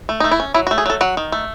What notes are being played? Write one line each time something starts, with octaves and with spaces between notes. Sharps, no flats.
A3
A3 D#4
E4
C#4
F#3 E4
F#4
A3
G#4
F#3 A4
F#3 F#5
D#3
A3